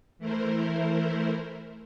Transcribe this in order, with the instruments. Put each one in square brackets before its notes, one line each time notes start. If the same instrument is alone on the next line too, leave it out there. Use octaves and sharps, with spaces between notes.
[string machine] E3 A3 E4 A#4 C5